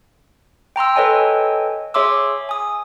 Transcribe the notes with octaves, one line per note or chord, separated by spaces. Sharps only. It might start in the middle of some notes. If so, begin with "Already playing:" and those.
G5 A#5 C6 E6
A4 B4 C#5 D#5 G5 G#5
G#4 C#5 E5 C6 D6 E6
G#5 D#6